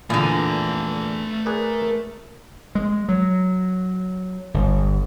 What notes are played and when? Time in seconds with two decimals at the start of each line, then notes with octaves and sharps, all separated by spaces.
0.10 E2 A#2 D3 A3 A#5
1.46 G#4 A#4 B4 D5
2.75 G#3
3.09 F#3
4.54 G1